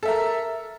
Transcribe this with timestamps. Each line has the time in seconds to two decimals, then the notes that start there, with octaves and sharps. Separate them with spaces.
0.03 A4
0.05 E5
0.08 A#4